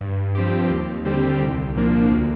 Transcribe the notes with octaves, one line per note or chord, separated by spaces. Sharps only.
G2
F3 C4 G4
D#2
D3 G3 C4 G4
C2
A#2 F3 A#3 D4
D2